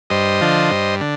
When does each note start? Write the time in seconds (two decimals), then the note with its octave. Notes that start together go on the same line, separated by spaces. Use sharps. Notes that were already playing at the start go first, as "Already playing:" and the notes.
0.10 G2 C5 D#5
0.41 D3 F3
0.71 G2
1.01 D3